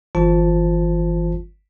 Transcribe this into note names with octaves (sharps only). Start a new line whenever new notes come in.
G1 E3 F4 C5 A5